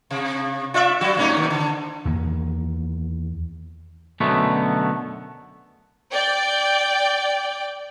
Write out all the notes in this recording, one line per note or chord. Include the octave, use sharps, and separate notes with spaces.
C3
F4 D5 E5
F#3 G3 F#4
A2 C#4 D#4
D#2 C3
D3
E2 D#3 A#3
F#2 B2 D3 A3 B3
D5 G5